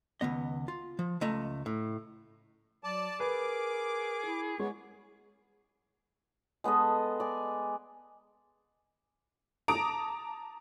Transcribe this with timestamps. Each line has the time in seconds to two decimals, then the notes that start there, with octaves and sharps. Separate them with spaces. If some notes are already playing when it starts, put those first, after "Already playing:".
0.21 C#2 D#3 B3 D#5
0.68 F4
0.99 F3
1.21 C#2 A3 D#5 A5 A#5
1.66 A2
2.84 F#3 D5 A5
3.20 G#4 A#4 B4 D6
4.26 E4
4.59 G#3 B3 G#4 C#5
6.64 G#3 B3 A4 D#5
7.20 D5 G#5
9.68 A5 A#5 D6 D#6 D7